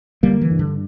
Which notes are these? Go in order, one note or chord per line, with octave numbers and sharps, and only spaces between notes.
D3 G3 A#3
E3
G2
D3